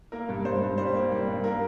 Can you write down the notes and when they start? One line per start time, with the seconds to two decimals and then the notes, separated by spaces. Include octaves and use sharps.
0.12 A#3 A#4
0.29 G2
0.45 G2 C5
0.62 G2
0.78 G3 C5
0.95 A#3
1.11 G3
1.28 G2
1.44 A#3 A#4